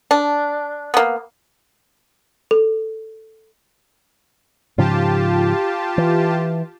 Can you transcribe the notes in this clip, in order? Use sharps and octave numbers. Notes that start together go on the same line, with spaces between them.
D4
A#3 B3
A4
G#2 C#3 F3 F4 G4 A5
E3